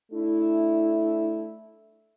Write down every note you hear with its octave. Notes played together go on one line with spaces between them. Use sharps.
A3 D4 E4